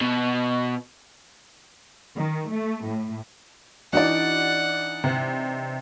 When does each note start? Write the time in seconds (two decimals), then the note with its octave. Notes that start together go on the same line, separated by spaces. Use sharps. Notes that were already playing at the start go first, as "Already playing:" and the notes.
0.01 B2
2.16 D#3
2.50 A3
2.87 A2
3.93 E3 D4 D#4 F#4 D5 F#5
5.04 C3